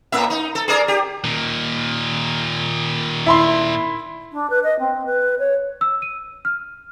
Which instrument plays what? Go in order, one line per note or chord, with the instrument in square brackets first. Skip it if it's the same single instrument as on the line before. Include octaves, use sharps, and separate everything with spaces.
[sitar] A2 A#3 E5
D#4
A4
G#4 A#4 D5
G4
[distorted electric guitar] A#2 D#3
[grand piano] E4 B5 C6
[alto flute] D4
B4
D#5
C4
B4
C#5
[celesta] E6
D#7
F6